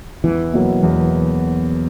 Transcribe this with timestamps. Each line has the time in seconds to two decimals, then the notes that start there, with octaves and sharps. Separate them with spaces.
0.24 E2 E3
0.53 B2 F#3 A#3
0.83 E2